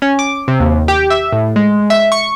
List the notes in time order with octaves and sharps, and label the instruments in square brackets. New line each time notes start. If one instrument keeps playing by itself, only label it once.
[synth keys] C#4
D6
C3
D#2
G4
E5
A2
G#3
E5
C#6